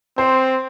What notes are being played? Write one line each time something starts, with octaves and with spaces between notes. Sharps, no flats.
C4 C5